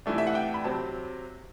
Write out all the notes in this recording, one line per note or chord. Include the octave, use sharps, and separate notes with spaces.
C3 E3 A3 D4
E5
F#5
G5
B5
C3 F#3 C4 A5